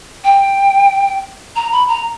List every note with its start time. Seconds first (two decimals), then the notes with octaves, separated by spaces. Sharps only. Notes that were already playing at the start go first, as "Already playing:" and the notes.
0.24 G5
1.56 A#5
1.72 B5
1.88 A#5